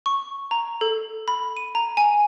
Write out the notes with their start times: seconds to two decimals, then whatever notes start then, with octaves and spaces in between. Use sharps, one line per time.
0.06 C#6
0.51 A#5
0.81 A4
1.28 B5
1.57 D#7
1.75 A#5
1.97 G#5